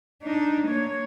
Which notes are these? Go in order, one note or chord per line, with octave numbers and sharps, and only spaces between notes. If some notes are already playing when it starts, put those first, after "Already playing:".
D4 D#4
A#3 C#5